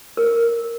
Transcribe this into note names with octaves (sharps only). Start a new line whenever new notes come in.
A#4